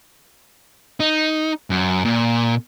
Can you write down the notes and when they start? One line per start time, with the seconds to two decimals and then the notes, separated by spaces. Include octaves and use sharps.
1.00 D#4
1.70 F#2
2.05 A#2